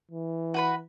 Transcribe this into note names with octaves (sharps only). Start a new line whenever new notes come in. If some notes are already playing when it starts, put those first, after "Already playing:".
E3
F#4 B4 B5